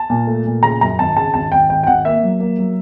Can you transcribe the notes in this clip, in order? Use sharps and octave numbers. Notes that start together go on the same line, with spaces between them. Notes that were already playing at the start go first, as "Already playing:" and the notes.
Already playing: A5
A#2
A3
A#2
C#3 A#5
F#2 A#5
G#1 A5
C#3 A5
G#1 A5
G#1 G5
G#1 G5
G5
G#1 F#5
A#3 E5
F#3
A#3
F#3